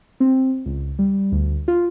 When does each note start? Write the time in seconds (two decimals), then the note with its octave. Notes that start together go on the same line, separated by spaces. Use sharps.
0.20 C4
0.66 C#2
0.99 G3
1.32 D2
1.68 F4